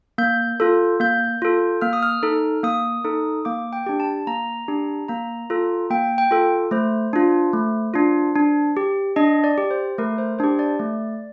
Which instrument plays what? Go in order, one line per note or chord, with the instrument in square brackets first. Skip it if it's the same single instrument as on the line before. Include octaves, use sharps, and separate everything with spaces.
[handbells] A#3 G6
F4 A4
A#3 G6
F4 A4
A#3 F6
D#6
F6
D#4 A4
A#3 D#6
D#4 A4
A#3 D6
G5
D4 G4
A5
A#3 A#5
D4 G4
A#3 A#5
F4 A4
A#3 G5
G5
F4 A4
A3 C5
D4 F4
A3
D4 F4
D4
G4
D4 D#5
D5
G4
C5
A3 A#4
C5
D4 G4 C5
D5
A3